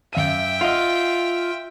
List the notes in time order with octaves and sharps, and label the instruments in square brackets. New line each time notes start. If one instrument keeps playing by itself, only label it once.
[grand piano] F#2 F5 D#7 [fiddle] E5 G5
[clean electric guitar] F4 [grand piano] D#5 F#5